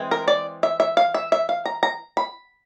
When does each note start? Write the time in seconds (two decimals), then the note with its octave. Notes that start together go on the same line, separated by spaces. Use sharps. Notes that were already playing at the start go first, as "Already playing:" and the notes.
Already playing: E3 G#3 C4
0.11 A#4
0.28 D5
0.63 E5
0.80 E5
0.97 F5
1.14 E5
1.32 E5
1.49 F5
1.66 A#5
1.83 A#5
2.17 B5